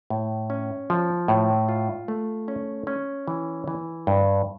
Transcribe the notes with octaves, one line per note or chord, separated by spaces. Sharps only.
A2
C#4
F3
A2
F4
A3
C#4
C#4
E3
E3
G2